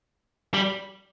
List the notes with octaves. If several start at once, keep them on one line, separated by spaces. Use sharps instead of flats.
G3